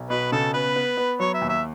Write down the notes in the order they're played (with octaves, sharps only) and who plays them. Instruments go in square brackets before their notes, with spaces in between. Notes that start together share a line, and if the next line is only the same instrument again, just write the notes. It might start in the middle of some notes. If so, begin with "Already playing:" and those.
Already playing: [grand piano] B1
[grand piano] B2 [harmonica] B4
[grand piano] C#3 [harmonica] A4
[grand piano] B3 [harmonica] B4
[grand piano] B3
B3
[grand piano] F#3 [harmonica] C#5
[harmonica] E5
[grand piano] D#2
[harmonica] E5